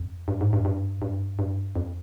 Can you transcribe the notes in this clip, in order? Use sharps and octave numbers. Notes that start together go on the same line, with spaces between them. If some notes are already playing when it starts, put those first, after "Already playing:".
Already playing: F2
G2
G#2
G2
G2
G2
G2
F2